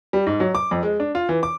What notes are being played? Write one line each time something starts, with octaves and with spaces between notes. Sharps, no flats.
G3
G#2
F#3
D6
F2
G#3
D4
F4
E3
D6